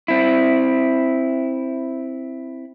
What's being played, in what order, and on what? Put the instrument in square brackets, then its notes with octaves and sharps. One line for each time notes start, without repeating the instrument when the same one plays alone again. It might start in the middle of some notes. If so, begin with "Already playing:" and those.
[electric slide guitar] C4 E4